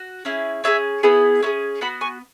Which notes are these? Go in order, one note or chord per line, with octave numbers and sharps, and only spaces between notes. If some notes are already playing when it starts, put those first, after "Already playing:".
Already playing: F#4
C#4 E4 G#4
C#4 E4 G#4 E5 G#5
B3 E4 G#4
C#4 E4 G#4
B3 F#4 F#5 B5
G#5 C#6